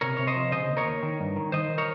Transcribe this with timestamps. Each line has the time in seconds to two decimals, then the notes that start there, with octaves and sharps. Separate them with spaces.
0.01 C3 A#4 C#5
0.17 C3 C#5
0.27 C5 D#5
0.36 F3
0.52 C#3 C5 D#5
0.68 D#2
0.77 A#4 C#5
0.86 D#2
1.03 D#3
1.20 G2
1.36 D#3
1.52 D#3 C5 D#5
1.70 D#3
1.78 A#4 C#5